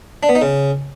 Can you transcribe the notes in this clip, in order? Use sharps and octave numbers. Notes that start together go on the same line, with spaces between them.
D4
B3
D#4
C#3